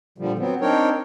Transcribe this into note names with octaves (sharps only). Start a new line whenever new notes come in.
A#2 D3 F3 G3
F#3 B3 C4
C4 D4 D#4 A#4 C#5 G5